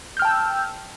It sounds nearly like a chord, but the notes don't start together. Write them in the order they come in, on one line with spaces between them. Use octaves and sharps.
G6 F6 G5 A5 E6